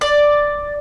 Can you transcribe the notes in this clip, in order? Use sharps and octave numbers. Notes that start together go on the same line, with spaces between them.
D5